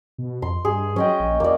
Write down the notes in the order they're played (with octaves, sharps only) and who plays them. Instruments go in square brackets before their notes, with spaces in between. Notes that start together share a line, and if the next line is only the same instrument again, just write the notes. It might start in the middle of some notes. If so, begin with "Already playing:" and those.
[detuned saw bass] B2
[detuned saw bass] F2 [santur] C6
[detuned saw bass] G2 [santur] G#4
[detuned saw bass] F#3 [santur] C#4 D#5 G5
[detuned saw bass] A#1
[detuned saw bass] E2 [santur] A#3 D5